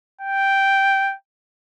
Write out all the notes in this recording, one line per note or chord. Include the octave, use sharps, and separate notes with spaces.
G5